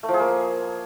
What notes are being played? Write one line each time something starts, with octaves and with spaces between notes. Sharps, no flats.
A3
F3
G#4
A#3